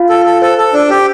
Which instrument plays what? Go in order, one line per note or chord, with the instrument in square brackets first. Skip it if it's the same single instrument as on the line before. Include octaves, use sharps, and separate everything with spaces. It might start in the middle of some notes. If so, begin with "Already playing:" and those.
Already playing: [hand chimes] F4 F5
[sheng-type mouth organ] A4
A4
[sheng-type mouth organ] A4 [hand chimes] C5
[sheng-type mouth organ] A4
D4
G4